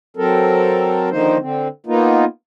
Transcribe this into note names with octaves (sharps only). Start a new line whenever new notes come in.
F#3 C4 A4 A#4
D3 D#3 F3 A#3 D#4 C5
D3 C4
A#3 B3 D#4 F4